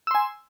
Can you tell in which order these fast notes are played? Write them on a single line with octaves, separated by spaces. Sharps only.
E6 C6 G#5